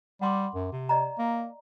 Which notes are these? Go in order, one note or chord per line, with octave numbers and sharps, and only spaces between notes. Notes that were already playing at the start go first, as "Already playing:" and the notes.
G3 F#5 C6 D6
F#2
C3
D5 D#5 A#5
A#3